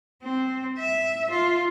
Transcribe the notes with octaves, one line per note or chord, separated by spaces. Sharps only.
C4
E5
F4